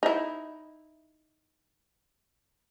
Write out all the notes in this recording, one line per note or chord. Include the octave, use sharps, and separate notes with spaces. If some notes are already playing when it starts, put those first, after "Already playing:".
D#4 E4